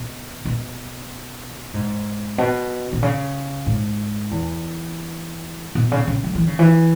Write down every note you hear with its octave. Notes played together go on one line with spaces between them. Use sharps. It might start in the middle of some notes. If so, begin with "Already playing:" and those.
Already playing: B2
B2
G#2
B2
B2
C#3
G#2
E2
B2
C#3
C#3
F#3
E3
C#3
E3